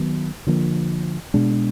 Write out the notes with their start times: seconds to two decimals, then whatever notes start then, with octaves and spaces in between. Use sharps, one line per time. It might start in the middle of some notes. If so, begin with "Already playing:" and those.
Already playing: D#3 F#3 B3
0.47 D3 F3 A#3
1.34 B2 G#3 D4